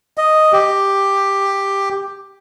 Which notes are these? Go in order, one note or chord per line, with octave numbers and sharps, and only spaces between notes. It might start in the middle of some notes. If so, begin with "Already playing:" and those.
D#5
G4